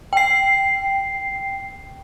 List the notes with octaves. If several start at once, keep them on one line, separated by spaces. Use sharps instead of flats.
G5 C7